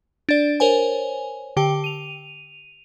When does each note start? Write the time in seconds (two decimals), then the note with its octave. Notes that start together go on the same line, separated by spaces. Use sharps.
0.29 D4 D5
0.60 A#4 C5 C#5 G#5
1.57 D3 G4 G5
1.84 D#7 F7